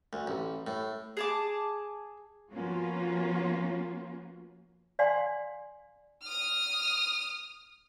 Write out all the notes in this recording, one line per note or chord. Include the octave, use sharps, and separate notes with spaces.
D2
A1
A2
G#4 A5 D6
F3 A#3 B3 C#4 F4 F#4
D5 F5 F#5 G#5 C6
D#6 F6